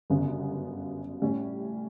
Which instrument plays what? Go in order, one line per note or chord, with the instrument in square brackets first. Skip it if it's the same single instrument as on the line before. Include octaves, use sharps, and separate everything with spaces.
[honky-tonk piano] G1 F#2 C#3 G3 B3
A2 G3 C#4